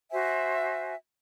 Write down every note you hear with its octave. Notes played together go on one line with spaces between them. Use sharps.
F#4 C5 E5 G#5